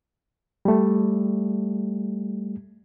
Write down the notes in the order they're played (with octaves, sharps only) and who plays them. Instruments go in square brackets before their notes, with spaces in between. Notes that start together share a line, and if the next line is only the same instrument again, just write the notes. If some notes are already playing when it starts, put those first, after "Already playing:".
[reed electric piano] G3 A3